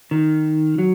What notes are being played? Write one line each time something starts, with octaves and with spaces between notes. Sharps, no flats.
D#3
F#3